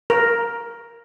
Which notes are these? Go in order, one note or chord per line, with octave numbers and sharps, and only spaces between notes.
A#4